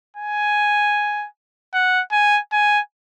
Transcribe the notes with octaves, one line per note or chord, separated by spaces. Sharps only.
G#5
F#5
G#5
G#5